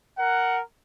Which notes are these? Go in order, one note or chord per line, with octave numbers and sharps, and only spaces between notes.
A#4 F#5